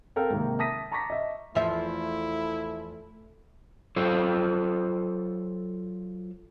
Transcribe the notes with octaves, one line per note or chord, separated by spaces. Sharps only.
C4 A4 A#4 F5 G5
G#2 C3 D#3 A#3
E5 A5 D#6 A#6 B6 D#7
A5 A#5 C#6 D6 A#6 B6
D#5 E5
E2 F3 A3 E4 E5
F#3 F4 A4 C5